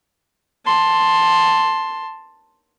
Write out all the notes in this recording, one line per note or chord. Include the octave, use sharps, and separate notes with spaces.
A5 C6